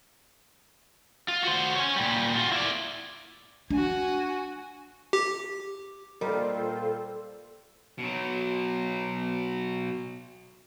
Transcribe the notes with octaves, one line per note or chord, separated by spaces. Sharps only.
F4
F#4 C5
C#5 G#5
A#2 G3
F4 F#4
E4 D5
D4 F#4 G#5
G4
A#2 G3 F4 A4 A#4 C5 D#5 A#5
B2 F#3